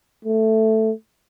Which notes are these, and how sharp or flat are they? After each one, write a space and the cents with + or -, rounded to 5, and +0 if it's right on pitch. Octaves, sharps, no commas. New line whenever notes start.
A3 +5